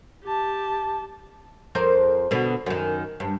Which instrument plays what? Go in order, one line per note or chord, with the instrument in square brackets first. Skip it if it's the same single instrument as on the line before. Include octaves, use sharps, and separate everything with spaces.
[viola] G4 A5
[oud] F2 A#4 C5
B2 D3 B3
F#2 D#3
G2